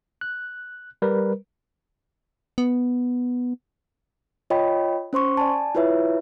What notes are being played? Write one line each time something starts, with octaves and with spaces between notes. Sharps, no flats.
F#6
G3 A#4 B4
B3
F4 C#5 D#5 G5 B5
C#4 C5 C6 C#6
D5 G#5 A5
E4 F4 B4 C#5 E5